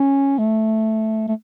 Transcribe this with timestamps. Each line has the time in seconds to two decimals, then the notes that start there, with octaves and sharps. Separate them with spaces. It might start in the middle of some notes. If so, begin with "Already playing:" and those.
Already playing: C#4
0.38 A3
1.28 A3